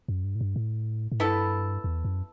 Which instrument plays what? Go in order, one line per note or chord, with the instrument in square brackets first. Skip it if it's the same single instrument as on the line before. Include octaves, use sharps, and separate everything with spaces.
[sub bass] F#2
G2
A2
G2
A2
A2
[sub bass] G2 [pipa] B3 E4 A4
[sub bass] E2
F#2